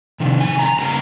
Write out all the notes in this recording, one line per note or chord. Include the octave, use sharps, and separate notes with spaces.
C3 D#3
G#5
A#5
C#3 G3 A#3 A#5